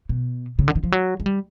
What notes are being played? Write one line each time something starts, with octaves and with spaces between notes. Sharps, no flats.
B2
C#3
D3
D#3
F3
F#3
G#3
G3